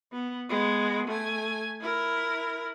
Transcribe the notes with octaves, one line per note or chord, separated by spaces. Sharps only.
B3
G#3 B3
A3 G#5
E4 A#4